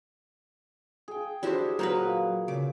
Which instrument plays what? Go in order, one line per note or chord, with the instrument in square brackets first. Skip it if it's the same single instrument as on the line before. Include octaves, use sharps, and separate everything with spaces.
[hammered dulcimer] G#4 G5
[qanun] D4 G4 E5 [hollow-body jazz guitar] E4 F#4 C5
[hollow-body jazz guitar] F#3 C5 A#5 [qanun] A#3 F#4 B4
[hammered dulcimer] A#2
[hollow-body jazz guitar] C#3 [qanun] D6